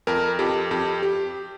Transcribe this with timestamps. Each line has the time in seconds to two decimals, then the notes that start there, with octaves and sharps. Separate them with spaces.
0.07 F2 A#4
0.39 F2 G4
0.71 F2 G4
1.03 G4